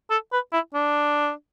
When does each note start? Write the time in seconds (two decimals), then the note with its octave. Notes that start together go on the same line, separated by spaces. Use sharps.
0.11 A4
0.32 B4
0.53 E4
0.74 D4